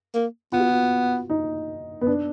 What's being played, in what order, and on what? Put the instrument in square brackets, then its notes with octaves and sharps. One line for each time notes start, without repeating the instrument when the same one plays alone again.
[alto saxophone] A#3
[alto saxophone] B3 [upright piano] F4
[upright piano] F#4
F4
D#4
B3
D4